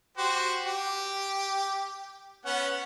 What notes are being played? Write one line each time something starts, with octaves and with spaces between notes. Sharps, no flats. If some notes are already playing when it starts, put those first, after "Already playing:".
F#4 G4 C5
G4
B3 C#4 F#5